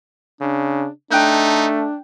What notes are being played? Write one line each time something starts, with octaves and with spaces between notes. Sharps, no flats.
C#3 D4
A3 D4 D#4 G5 F#6 G6